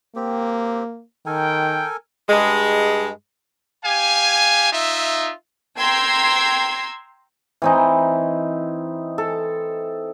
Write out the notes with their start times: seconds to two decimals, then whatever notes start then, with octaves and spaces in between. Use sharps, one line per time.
0.16 A#3 C4 G4
1.26 D#3 A4 A#4 G5 G#5
2.30 G2 G#3
3.85 G4 F5 G#5
4.73 D#4 F4 E5
5.78 G5 A#5 C6 E6 G#6 C7
7.62 E3 C4 D#4
9.18 A4